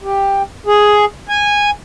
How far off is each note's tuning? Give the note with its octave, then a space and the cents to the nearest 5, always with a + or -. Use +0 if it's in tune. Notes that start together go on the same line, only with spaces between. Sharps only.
G4 +10
G#4 +5
G#5 -10